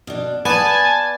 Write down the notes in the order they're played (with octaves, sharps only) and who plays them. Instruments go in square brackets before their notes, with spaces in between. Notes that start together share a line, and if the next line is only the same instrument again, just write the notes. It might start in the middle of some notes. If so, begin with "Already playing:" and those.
[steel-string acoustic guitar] B2 D4
[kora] B3 [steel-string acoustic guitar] D5 [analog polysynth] G#5 A5